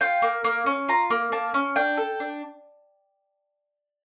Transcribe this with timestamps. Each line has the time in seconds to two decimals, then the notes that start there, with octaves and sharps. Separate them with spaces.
0.01 F4 G5
0.22 A#3
0.44 A#3
0.66 C#4
0.89 F4 A#5
1.10 A#3
1.32 A#3 A5
1.54 C#4
1.76 D4 G5
1.97 A4
2.20 D4